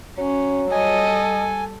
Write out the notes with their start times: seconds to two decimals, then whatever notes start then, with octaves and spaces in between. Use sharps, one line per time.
0.18 F#3 C#4
0.72 G3 A4 D#5 G#5